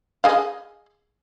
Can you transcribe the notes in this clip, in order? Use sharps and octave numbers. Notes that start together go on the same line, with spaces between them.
G#4 D#5 F5